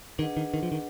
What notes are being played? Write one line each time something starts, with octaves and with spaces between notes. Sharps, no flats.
D#3 D4 G#4 B4 D#5 F#5
D#3
D#3
F3
D#3